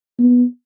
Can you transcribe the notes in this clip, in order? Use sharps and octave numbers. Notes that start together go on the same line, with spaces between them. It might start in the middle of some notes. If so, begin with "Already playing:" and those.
B3